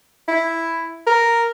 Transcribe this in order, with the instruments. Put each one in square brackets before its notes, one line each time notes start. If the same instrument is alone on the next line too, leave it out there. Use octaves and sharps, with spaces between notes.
[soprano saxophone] E4
A#4